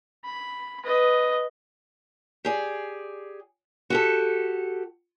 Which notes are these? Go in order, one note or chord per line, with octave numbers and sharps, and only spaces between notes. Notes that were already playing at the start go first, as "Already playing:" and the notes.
B5
B4 D#5
G4 G#4 D5
F#4 G4 A4